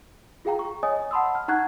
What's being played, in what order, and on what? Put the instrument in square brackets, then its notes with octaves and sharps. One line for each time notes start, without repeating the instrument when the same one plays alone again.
[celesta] F4 G#4 F5 G5 A#5
C#6
C#5 D#5 G#5 D#6
F#5 A5 B5 C6 D#6 E6
F6
D#4 F#5 A#5 C#6 F#6 G#6